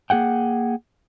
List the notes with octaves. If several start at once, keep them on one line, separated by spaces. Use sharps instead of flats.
A#3 G#4 F#5 G5